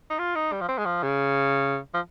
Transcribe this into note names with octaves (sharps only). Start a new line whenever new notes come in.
D#4
F4
D#4
G3
F3
C4
G#3
F3
C#3
F3